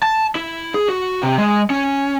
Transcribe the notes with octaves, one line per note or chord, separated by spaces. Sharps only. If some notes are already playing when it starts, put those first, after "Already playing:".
A5
E4
G#4
F#4
C3
G#3
C#4